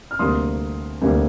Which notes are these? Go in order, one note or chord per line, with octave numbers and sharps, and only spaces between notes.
F6
D2 C3 G3 A#3 C6 D#6
D2 C3 G3 A#3